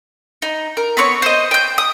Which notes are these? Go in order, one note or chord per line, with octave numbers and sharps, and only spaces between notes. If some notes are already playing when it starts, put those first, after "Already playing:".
D#4
A#4
B3 C4 C#5 C#6
C5 D#5
G5 G6
D#6